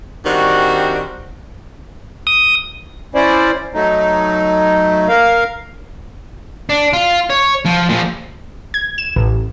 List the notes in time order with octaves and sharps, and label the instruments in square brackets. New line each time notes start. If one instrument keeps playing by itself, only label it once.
[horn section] D#3 G3 C4 D4 F#4
[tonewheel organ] D#6
[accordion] C#4 E4 C5 D5
F#3 A3 D#4
A#4 F5
[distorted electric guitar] D4
F4
C#5
F3
A#2 F3
[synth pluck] G#6
E7
A1